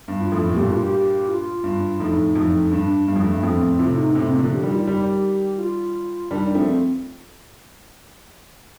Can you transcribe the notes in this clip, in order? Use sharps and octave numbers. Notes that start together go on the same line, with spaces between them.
G2
F4
F2 A2
A2
G2 A#2 G4
F4
G4
F4
G2
F2 A2 D#4
F2 A2
G2 D4
G2 G3
F2
G2 A3
F2 A2 C4
C4
A2 C3 F4
D#4
A2 C3 C4
A#3
D3 F3
G4
D#3 G3
F4
D#3 G3 G4
F4
D#3 G3 D4
F3 A3 C4